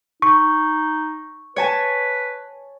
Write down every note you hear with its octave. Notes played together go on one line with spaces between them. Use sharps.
D#4 C#6
B4 C#5 G#5 A5